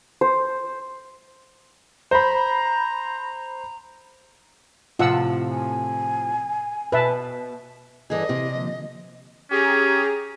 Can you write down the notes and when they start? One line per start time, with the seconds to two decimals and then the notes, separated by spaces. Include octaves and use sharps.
0.21 C5
2.11 C5 A#5 B5
4.99 A2 C3 F3 F4 F#5 E6
5.51 G#5
6.92 B2 B4 E5 A5
8.10 G2 E3 G#4 A4 D5 D#5
8.29 C3 C4 E4 G4
8.55 D3 F3 A#3
9.51 C#4 G4 G#4 A#5